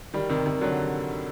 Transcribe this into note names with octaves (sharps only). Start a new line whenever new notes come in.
D#3 G3
C3 D#3
C3 D#3
D3 F#3